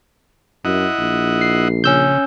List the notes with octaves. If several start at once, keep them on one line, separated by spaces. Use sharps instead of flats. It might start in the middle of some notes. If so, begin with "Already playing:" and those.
F#2 E4 D#5 F#5
A#1
C7
C#3 C#4 E6 G6